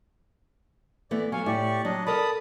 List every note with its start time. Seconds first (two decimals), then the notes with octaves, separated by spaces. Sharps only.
1.11 E3 A3 B3 D5
1.32 F#3 F5 G#5 C#6
1.46 A2 E4 G4 D5 C#6
1.85 F#3 D4 D#5
2.07 A4 A#4 D5 A5 B5 D#6